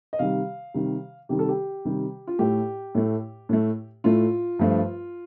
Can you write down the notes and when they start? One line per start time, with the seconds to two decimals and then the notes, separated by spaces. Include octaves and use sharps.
0.13 D#5
0.19 C3 D#3 G3 F5
0.74 C3 D#3 G3
1.29 C3 D#3 G3 G4
1.39 A4
1.49 G4
1.85 C3 D#3 G3
2.27 F4
2.39 A2 A3 G4
2.95 A2 A3
3.49 A2 A3
4.04 A2 A3 F4
4.59 G2 F3 A3